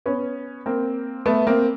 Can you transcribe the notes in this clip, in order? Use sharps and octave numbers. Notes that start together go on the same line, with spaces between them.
B3 C#4
A#3 C4
A3 B3
A#3 C4